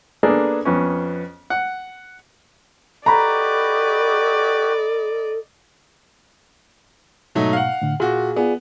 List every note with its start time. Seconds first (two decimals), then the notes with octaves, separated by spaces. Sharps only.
0.23 A#3 B3 D4 G#4 A4
0.65 F2 B3 C#4
1.50 F#5
3.06 F#4 G4 A4 B4 D5 D#5 A#5 B5
7.35 G#2 B2 F#3 A3 D#4
7.53 F5 F#5
7.82 A2 D3
8.00 A#2 F#4 G#4
8.36 B3 F4 G#4 D5